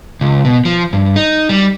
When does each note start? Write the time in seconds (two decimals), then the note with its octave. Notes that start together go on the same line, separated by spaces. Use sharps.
0.21 C#2
0.45 B2
0.65 F3
0.93 G2
1.16 D#4
1.49 G3